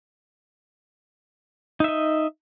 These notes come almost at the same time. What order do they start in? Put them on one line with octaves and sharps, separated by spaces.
D#4 E5 D#5